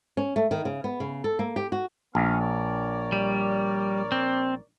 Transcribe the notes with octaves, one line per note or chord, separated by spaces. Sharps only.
C#4
A3
D#3
C#3
B3
C#3
A4
A#3
G4
F#4
A#1 B3 C#4 F5
A#4 C#5 D5
G3
C4